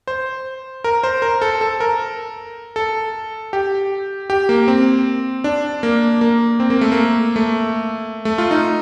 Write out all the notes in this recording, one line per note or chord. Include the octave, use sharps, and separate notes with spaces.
C5
A#4
C5
A#4
A4
A4
A#4
A4
G4
G4
A#3
C4
D4
A#3
A#3
C4
A#3
A3
A#3
A3
A3
F4
D#4